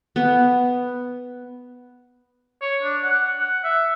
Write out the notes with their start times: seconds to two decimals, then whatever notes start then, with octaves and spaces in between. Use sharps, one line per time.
0.16 B3
2.62 C#5
2.83 D4
3.03 F#5
3.38 F#5
3.64 E5